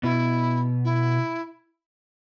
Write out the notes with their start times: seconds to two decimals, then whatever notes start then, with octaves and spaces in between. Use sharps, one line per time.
0.03 B2 B3 E4
0.85 E4